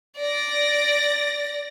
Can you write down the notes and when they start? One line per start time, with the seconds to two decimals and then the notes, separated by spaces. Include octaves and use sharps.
0.17 D5 A#6